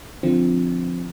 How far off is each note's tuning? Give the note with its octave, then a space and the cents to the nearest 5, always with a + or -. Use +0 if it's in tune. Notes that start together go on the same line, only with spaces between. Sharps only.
D3 +0 F3 +0 C4 +0